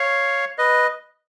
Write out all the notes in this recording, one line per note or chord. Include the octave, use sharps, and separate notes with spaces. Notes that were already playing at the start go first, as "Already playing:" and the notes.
Already playing: C#5 F5
B4 D#5